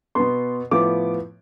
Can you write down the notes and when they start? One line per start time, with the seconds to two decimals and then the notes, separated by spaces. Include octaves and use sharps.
0.15 B2 B3 C6
0.71 A2 F3 B3 D6